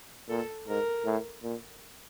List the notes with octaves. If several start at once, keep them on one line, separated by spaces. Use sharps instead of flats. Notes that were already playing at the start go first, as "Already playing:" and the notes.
A#2 A4
G#2 A#4
A2
A#2